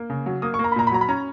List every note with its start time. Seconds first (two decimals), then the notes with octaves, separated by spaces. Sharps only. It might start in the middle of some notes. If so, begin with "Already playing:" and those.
Already playing: A#3
0.10 C#3
0.26 F#3
0.42 A#3 D#6
0.54 C#6
0.59 A#3
0.64 A#5
0.72 B5
0.76 A#2 A#5
0.87 B5
0.91 F#3 A#5
1.01 B5
1.08 C#4 A#5